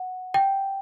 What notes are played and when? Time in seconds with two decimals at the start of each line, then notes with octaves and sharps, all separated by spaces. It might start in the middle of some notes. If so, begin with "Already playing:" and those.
Already playing: F#5
0.34 G5